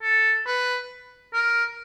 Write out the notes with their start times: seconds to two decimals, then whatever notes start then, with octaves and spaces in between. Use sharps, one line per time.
0.02 A4
0.46 B4
1.34 A#4